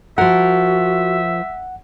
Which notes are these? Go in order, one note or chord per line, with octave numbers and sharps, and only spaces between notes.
F3 F#4 A#4 E5 F#5